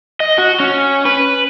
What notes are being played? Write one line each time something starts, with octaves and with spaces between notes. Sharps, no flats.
D#5
F#4
C#4
B4